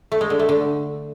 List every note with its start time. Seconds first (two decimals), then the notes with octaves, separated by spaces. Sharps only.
0.12 A3
0.21 G#3
0.30 D3
0.39 A3
0.49 D3